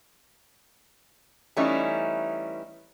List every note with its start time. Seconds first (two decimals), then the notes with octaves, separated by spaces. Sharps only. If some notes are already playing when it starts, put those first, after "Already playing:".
1.57 E3 G3 A3 C#4 D#4 E4